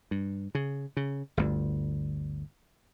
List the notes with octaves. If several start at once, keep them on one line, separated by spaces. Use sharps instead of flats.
G2
C#3
C#3
G1 D2